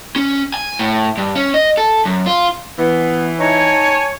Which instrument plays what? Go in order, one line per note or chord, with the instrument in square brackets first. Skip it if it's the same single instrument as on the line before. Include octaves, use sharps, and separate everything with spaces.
[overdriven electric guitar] C#4
G#5
A2
G2
C#4
D#5
A4
F#2
F4
[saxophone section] E3 [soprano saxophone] B3
[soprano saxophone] D#4 [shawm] C#5 [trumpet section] G#5 A5